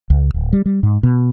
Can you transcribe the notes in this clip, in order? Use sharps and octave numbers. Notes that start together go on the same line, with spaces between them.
C#2
D1
G3
G3
G#2
B2